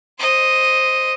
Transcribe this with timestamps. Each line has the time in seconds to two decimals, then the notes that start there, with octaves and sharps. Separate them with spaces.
0.19 C5 D#5